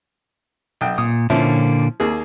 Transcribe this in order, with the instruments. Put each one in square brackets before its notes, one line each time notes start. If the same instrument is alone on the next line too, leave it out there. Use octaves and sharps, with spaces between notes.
[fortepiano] B1 G5
[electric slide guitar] A#2 [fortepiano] D#6
[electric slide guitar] A#2 D3 A#3 [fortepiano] F3 C#4 E4
[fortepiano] D#2 A#3 G#4